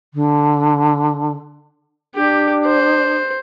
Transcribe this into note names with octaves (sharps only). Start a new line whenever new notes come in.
D3
D4 G4
C5